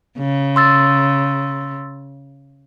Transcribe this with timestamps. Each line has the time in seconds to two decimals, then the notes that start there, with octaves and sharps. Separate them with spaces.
0.18 C#3
0.56 C6 E6 A6